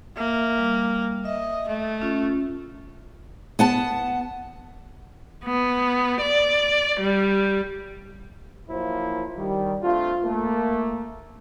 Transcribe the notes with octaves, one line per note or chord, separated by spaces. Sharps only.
A#3 E5
G3
D#5 E5
A3
C#4 F4
B3 F#5 A5
B3
D5
G3
F3 F#3 A#3 E4 F4 C5
D#3 G3
A3 C4 D4 F4
A3 A#3